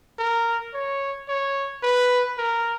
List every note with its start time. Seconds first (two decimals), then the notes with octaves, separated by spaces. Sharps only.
0.19 A#4
0.74 C#5
1.28 C#5
1.83 B4
2.38 A#4